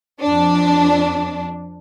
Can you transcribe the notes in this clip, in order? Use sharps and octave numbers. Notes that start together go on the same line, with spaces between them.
F2 D4